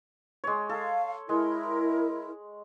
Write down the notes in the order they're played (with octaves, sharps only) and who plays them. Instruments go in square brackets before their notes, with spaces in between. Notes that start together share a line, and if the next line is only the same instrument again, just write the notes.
[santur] G#3 C#5
[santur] A4 [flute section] F5
[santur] G#3 [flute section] E4 A#4